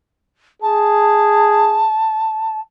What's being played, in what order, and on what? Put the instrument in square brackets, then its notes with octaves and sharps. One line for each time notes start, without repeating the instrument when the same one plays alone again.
[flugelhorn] G#4 [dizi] A5